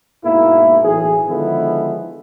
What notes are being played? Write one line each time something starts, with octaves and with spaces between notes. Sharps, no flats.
G#2 B2 A#3 E4
B1 A2 E3 G#4
D3 D#3 F3 G#3 B3 E4